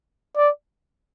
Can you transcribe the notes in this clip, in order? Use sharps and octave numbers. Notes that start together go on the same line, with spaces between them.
D5